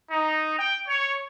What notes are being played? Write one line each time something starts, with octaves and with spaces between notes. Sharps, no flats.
D#4
G5
C#5